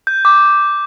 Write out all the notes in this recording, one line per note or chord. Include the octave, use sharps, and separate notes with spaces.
G6
D6